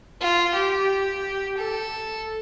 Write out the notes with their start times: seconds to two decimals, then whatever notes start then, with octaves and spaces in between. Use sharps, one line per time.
0.20 F4
0.54 G4
1.57 A4